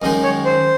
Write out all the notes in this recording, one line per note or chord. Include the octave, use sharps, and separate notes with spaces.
F#2 D#3 G#3 D#5
C#5
C5